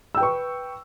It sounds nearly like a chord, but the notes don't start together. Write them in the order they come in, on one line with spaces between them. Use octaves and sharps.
E6 G5 B4 C#6